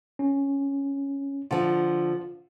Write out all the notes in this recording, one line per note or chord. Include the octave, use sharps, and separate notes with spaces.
C#4
D3 F3 F4